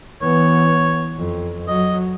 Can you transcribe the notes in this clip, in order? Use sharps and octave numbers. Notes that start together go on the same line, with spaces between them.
E3 B3 C#5
F2
F#3 D#5